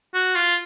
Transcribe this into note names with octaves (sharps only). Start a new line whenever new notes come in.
F#4
F4